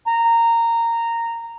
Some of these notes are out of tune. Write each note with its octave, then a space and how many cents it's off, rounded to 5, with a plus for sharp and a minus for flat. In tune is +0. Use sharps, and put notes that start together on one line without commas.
A#5 -15